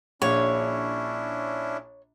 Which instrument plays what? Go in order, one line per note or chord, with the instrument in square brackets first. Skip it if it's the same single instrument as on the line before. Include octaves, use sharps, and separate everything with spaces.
[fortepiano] A#1 [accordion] C#4 D4 E4 [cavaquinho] C#5